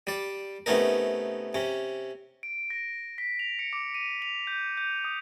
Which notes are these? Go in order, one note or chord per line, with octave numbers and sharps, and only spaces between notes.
G3 D5
C3 A3 B3 C#4 D#4 A#4
C3 C#4
D7
A#6
B6
F7
C#7
D6
D#7
F7
G6
G6
D#6